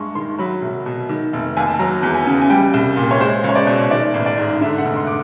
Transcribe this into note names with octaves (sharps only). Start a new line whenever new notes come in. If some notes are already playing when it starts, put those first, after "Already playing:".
Already playing: G2 G#3 C6 C#6
D#3 C6
F#3 B5
C2
B2
D#3
F1
D#2 G#5
A5
F#3 A#5
E2
G#5
C#3
G#5
G3 G5
C2
A#2
C#5
G#3 C5
C#2
C#5
D5
B2
D#3 D5
A1
D5
G#2
D3 E5
F#5
F1
C6
D6